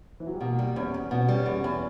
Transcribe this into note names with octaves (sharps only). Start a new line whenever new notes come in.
E3
F#3
G3
B2 A#3
G3
E2 C#4
E2
B2 B3
G3
C#4
E2
C#4
E2